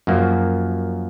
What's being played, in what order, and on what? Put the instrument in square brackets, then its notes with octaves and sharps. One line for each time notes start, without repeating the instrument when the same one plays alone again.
[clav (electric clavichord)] F#2 F3 A#3